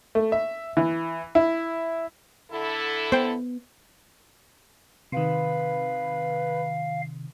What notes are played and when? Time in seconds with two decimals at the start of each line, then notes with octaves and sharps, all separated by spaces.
0.15 A3
0.32 E5
0.77 E3
1.35 E4
2.51 D3 E4 A4
3.12 B3 C5 G5
5.12 C3 D#3 B4 F5